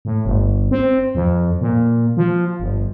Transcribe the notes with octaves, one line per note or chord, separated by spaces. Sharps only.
A2
G1
C4
F2
A#2
F3
G1